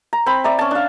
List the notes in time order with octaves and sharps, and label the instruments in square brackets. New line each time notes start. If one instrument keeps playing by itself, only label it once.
[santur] A#5
C4 B5
D5 E5 A#5
C#4 A5
D4 F5